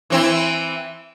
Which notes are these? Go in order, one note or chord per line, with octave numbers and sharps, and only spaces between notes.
E3 C4 E4